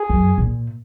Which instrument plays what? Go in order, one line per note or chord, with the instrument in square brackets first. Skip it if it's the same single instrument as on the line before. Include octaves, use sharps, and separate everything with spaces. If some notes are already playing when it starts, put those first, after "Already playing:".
Already playing: [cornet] G#4
[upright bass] F#2
A#2